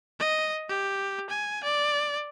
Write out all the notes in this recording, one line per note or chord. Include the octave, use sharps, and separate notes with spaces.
D#5
G4
G#5
D5